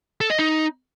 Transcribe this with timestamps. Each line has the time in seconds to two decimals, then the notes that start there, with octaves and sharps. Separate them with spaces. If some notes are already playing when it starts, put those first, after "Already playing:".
0.21 A4
0.30 D#5
0.39 D#4